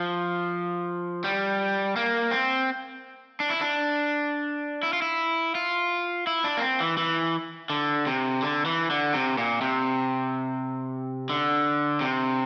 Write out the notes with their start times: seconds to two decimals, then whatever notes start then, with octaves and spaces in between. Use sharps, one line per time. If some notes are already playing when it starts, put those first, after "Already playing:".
Already playing: F3
1.24 G3
1.96 A#3
2.31 C4
3.40 D4
3.50 E4
3.61 D4
4.83 E4
4.93 F4
5.02 E4
5.55 F4
6.27 E4
6.44 D4
6.57 A#3
6.62 C4
6.80 E3
6.98 E3
7.70 D3
8.07 C3
8.42 D3
8.65 E3
8.90 D3
9.14 C3
9.38 A#2
9.61 C3
11.30 D3
12.01 C3